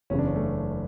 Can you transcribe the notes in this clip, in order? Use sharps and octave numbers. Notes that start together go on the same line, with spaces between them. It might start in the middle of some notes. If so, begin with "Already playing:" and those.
F#1 E2 C#3 C#4
D4
C#4
A3